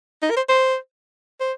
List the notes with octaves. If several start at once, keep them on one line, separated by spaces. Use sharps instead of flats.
D#4
A#4
C5
C5
C5